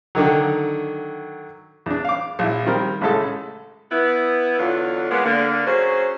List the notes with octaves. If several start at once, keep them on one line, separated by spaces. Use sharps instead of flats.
D3 D#3 F#3
E2 D4
F5 D6
A#1 E4
D#3 G3 C4 A#4
A1 A2 C#3 G#3 A4
B3 E4
E2 D3 F#3 F4
G#3 A#3 B3
D3 A#3
F#3 C#4 G#4 C5